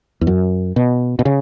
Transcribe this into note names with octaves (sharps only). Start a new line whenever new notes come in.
E2
F#2
B2
B2
C#3